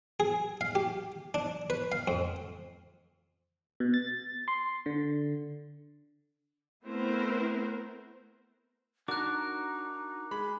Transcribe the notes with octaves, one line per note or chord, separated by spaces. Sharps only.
G#4
F5
G4
D4
B4
F5
F2
B2
A6
C6
D3
A3 B3 C4 E4 A#4 C5
D4 D#4 F#4 A#4 D6 F#6
G#3 B5